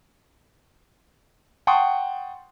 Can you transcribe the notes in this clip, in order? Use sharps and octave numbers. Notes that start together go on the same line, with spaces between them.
F#5 G5 A5 C6 C#6 D#6